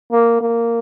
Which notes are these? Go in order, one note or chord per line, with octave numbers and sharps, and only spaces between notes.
A#3
A#3